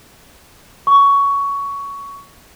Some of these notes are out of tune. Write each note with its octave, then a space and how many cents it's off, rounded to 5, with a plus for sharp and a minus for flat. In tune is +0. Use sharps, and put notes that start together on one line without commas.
C#6 +15